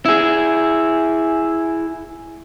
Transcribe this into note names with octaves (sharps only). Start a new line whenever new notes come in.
E4 G#4